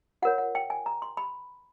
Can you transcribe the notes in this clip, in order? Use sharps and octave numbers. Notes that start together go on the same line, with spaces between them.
F4 A#4 C#5 F#5
F#5
G5
G#5
A#5
C6
B5